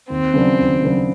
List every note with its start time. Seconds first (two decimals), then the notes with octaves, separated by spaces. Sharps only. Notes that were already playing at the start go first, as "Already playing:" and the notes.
0.10 D#2 C4
0.34 C#3 F#3 B3 D4
0.58 D#2
0.83 C#3 F#3 B3 D4